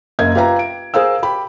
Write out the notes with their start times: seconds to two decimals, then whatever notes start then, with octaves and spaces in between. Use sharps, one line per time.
0.19 F#1 A#3 D#5 E5 G#6
0.35 F4 G4 B4 E5 F5 A#5
0.59 D7
0.94 G#4 A#4 C5 F5 E6
1.23 G4 B5